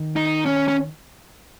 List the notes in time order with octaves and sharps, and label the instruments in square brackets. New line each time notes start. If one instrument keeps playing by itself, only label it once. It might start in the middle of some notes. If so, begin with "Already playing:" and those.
Already playing: [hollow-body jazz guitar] D#3
[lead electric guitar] D#4
C#4
C#4